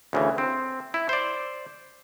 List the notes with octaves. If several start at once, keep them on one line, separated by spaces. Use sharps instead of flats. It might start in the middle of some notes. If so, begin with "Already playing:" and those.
D2 C#3 E3
C4
E4
C5 D5